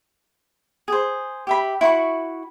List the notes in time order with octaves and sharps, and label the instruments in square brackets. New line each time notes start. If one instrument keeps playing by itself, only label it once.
[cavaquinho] G#4 C5
G4 E5 B5
E4 F#4 B5 C#6